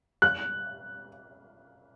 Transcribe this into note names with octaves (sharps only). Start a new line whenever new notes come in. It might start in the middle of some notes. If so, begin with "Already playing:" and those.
F#6